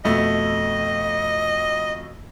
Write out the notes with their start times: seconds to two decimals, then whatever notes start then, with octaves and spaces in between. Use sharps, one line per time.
0.05 F2 B2 A3 D#5